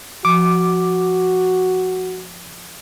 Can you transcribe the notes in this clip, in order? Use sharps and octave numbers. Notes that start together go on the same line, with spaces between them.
F3 F#4 D6